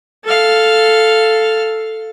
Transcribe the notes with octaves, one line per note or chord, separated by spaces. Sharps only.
A4 F5